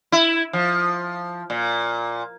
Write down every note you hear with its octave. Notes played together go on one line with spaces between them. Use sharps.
E4
F3
A#2